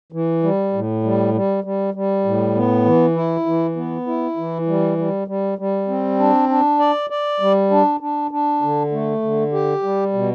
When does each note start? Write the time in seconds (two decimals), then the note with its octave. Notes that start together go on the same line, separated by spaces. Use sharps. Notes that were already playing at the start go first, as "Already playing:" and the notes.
0.12 E3
0.43 G3
0.73 A2
1.03 G3
1.34 G3
1.64 G3
1.94 G3
2.25 A2
2.55 B3
2.85 E3
3.16 E4
3.46 E3
3.76 B3
4.07 E4
4.37 E3
4.67 G3
4.98 G3
5.28 G3
5.58 G3
5.88 C4
6.19 D4
6.49 D4
6.79 D5
7.10 D5
7.40 G3
7.71 D4
8.00 D4
8.31 D4
8.62 D3
8.92 A3
9.22 D3
9.52 G4
9.83 G3
10.13 B2